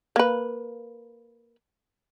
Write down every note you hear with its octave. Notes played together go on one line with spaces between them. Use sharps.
A#3 B4